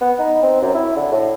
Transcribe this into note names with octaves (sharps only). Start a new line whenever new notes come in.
B3
D#4
C4
F#2
E4
D3
A2